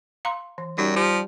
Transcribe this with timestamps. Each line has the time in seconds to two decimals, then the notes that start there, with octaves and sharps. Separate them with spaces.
0.25 F5 A#5 C6
0.58 E3
0.78 F#2 G3 D#4 G4
0.96 F3 G4